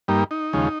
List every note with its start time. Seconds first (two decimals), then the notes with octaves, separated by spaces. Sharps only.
0.08 G2 G3 A#3 D#4
0.31 D#4
0.53 D#2 C#3 F3 G#3